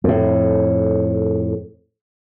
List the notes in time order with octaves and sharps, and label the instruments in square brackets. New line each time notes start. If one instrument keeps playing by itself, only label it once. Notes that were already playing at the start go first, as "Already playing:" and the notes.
[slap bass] F2 A2